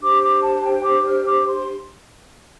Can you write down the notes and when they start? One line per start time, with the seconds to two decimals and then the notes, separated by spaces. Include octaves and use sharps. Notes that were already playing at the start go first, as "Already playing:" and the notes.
0.01 D4 G4 C5 D6
0.21 D6
0.42 A5
0.63 G5
0.83 D6
1.05 F6
1.25 D6
1.46 C6